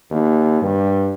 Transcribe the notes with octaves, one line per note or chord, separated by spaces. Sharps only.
D#2
G2